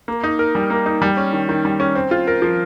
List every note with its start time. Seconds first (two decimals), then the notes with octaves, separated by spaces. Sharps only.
0.08 A#3
0.23 D#4
0.39 A#4
0.55 G3
0.70 A#3
0.86 D#4
1.02 G3
1.17 C#4
1.33 D#3
1.49 D#3
1.65 G3
1.80 C#4
1.95 C4
2.11 F4
2.27 A#4
2.42 F3